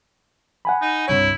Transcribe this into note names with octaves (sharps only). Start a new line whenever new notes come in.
F#5 G#5 B5
D#4
C2 G2 E4 C#5